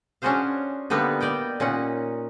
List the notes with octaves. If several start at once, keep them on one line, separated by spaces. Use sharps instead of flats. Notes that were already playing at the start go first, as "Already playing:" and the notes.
C#4 D4 F#4 G#4 C5 F5
D3 G3 A#3 B3 D#4 B4
G3 D5 D#5 G5
A#2 C#4 D#4 F#5